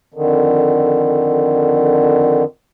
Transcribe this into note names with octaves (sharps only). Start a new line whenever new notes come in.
F2 D3 D#3